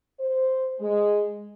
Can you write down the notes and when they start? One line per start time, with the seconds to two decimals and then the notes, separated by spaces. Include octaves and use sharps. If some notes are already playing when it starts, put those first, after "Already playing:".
0.20 C5
0.80 G#3